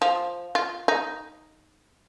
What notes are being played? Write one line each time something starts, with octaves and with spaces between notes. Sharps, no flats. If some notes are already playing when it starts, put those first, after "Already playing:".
F3
F4
D#4